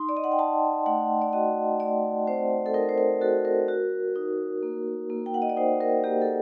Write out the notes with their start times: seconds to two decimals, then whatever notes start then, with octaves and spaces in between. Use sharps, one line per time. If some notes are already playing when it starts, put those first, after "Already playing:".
Already playing: D#4 C6
0.09 D5
0.17 D#5
0.24 F#5
0.32 G5
0.39 D#4 A5
0.86 A3 F#5
1.22 D5
1.33 F#4 D#5
1.80 A3 D5
2.27 C4 C5
2.66 A4
2.74 D#4 A#4
2.89 C5
2.98 A#4
3.21 F#4 A4
3.45 A#4
3.68 F#4
4.16 D#4
4.63 A#3
5.10 A#3
5.26 G5
5.34 F#5
5.42 D#5
5.49 D5
5.57 D#4 C5
5.81 A#4
6.04 A#3 G4
6.22 A4